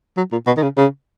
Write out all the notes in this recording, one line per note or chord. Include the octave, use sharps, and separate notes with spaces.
F#3
A#2
B2
D#3
C#3
C#3